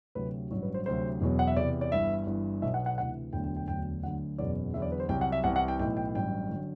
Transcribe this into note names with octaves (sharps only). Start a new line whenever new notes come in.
D2 C3 F#3 B4
A1 G2 F#3
B4
C5
D2 C3 F#3 C5
E1 E2 B2 F#3
F#5
E5
E2 C3 E3 D5
D5
G1 G2 E3 E5
G1 G2 E3
B1 B2 F#3 E5
F#5
F#5
D2 C3 E3 F#5
E1 D2 D3 F#3 G5
G5
G5
E1 D2 D3 F#3 G5
D2 D3 F#3 F#5
F#1 E2 B2 F#3 D5
E2 D3 F#3 E5
D5
B4
C5
C2 C3 F#3 G5
F#5
E5
C2 C3 E3 F#5
F#5
G5
B1 A2 E3 G5
G5
A1 G2 F#3 G5
D3 F#3